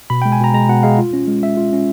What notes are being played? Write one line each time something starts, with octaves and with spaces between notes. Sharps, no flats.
B2 B5
G#3 G5
G#5
B2 A#5
G#3 A#5
B2 F#5
G#3 F5
F4
C#4
G#3
G#3 E5
F4
C#4